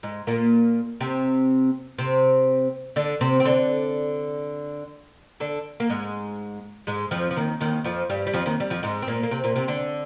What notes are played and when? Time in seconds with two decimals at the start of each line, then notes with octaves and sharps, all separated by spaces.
0.03 G#2 G#3
0.27 A#2 A#3
1.01 C3 C4
1.98 C3 C4
2.96 D3 D4
3.21 C3 C4
3.40 C4
3.45 D3 D4
5.40 D3 D4
5.80 A#3
5.90 G#2 G#3
6.87 G#2 G#3
7.11 F2 F3
7.31 F3
7.36 D#2 D#3
7.60 D#2 D#3
7.84 F2 F3
8.10 G2 G3
8.27 G3
8.33 F2 F3
8.46 D#2 D#3
8.60 G3
8.70 F2 F3
8.83 G#2 G#3
9.02 C4
9.07 A#2 A#3
9.23 A#3
9.31 C3 C4
9.44 A#2 A#3
9.56 C3 C4
9.68 D3 D4